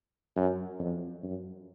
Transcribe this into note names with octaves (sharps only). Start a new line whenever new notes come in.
F#2
F2
F#2